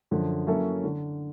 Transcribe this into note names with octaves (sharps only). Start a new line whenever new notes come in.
F#2 D3 F3
F#3 A#3 C#4 E4 A4
D3